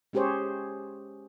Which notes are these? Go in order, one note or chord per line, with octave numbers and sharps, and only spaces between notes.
G#3 C#4 G4 G#4 C5 C#5